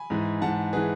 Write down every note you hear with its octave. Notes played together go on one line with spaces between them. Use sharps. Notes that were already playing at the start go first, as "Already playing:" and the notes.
Already playing: G#5 B5
G#2 E3
G#2 E3 F#5 A5
E3 G#4 B4